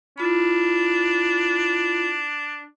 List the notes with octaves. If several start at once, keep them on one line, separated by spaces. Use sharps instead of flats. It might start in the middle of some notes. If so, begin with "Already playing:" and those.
D4 E4 F4 B5